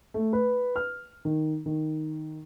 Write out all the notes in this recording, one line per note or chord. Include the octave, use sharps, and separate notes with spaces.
A3
B4
F6
D#3
D#3